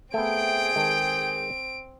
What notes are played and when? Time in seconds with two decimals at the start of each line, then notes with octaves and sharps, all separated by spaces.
0.14 A3 B3 C4 G#4 G5 D7
0.75 D#3 G#3 A4